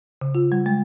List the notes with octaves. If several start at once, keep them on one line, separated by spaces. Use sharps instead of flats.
C#3
F4
G3
G#3